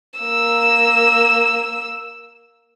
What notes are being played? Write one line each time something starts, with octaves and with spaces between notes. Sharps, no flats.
A#3 E6